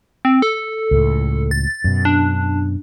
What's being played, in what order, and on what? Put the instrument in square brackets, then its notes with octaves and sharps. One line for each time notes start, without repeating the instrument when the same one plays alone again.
[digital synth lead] C4
A4
[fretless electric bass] C#2 A2
[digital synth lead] A6
[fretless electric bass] F#2 B2
[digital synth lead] D4